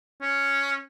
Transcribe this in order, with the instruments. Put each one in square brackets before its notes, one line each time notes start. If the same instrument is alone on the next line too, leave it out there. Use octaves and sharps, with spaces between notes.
[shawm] C#4